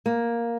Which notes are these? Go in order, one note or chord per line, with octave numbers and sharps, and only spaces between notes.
A#3